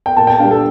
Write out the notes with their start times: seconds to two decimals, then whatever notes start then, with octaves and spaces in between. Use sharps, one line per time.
0.06 G5
0.17 A#2 A5
0.27 G5
0.39 G3 D4 F5
0.51 A4